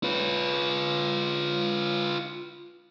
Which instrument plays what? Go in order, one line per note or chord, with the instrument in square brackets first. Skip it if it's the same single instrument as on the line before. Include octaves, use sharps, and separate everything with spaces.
[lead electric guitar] F4 B4